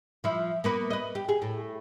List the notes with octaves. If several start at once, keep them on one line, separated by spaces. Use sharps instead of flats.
F3 E4
A#3 B3 B4
B4 D#5
G4
G#4
A2